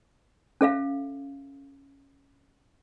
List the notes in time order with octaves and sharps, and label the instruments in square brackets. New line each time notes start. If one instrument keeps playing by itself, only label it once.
[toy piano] C#4 A4 E5 F5